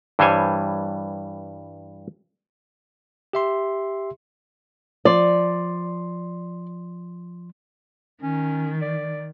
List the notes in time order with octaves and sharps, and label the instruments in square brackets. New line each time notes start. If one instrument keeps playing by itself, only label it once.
[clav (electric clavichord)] G2 E3 G3 C5 C#5 G#5
[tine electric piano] G4 E5 C6
[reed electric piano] F3 C6 [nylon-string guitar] D5
[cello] D#3 [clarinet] C#4
[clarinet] D5